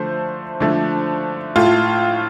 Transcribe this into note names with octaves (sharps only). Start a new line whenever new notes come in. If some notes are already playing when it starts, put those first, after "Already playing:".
Already playing: D3 F3 A3 C5
D3 F3 A3
A2 A3 F4